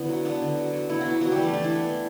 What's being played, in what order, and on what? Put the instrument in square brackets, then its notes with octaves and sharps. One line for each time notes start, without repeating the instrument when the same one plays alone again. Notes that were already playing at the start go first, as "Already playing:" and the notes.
Already playing: [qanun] D3 B3 E4
F#3
B3 D4
D3
F#3
F#3
B3 E4
F#3 F#4
B3 E4
F#3 B3 F#4
G3 G4
E3
A3 A4
E3 D4
E4
B3
D4
E3